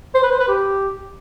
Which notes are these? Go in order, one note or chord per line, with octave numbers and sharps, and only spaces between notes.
C5
B4
C5
B4
G4